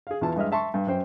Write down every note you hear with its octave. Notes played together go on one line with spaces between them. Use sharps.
G#4 F5
E2 E3 E4 F4 A5
G2 G#3 D#5 E5 F6
E5 A5 C6 C#6
G2
F#2 C5 G5